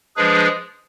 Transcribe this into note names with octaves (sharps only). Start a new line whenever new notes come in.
F3 G#3 D4 G#4 B4